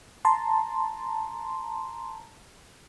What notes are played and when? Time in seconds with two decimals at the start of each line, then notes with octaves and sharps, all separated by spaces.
0.25 A5 A#5 C6